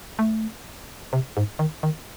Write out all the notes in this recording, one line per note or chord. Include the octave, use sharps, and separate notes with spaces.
A3
C3
G#2
D#3
D#3